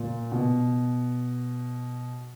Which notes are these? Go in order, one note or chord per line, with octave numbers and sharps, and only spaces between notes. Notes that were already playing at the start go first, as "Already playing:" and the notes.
Already playing: A#2
B2